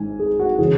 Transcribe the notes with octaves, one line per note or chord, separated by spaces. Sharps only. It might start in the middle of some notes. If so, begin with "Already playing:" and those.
Already playing: G#1 G#2 G#5
G#4
F#4
C#3 E3 G#4